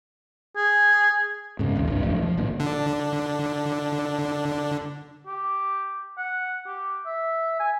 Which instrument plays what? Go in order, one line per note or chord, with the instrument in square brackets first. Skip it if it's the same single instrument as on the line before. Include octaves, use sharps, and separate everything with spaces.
[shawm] G#4
[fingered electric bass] G#2 C#3
A#1 D#2
C2 G2 D4
E1 B1 A2 F3
F3
G#1 A#2 D3
[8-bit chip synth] D3 D4
[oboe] G4
F#5
G4
E5
G#5